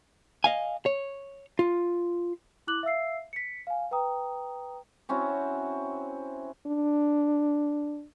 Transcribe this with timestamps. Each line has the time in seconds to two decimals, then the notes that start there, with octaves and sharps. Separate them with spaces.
0.44 D#5 F5 G#5
0.86 C#5
1.59 F4
2.67 E4 D6 F#6 F#7
2.83 E5 F5 E6 C7
3.33 B6 C#7
3.67 F5 G#5
3.91 B4 G5 A#5 D#6
5.09 C4 C#4 E4 F#4
6.67 D4